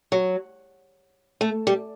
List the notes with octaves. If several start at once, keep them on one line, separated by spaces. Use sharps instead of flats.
F#3
A3
G3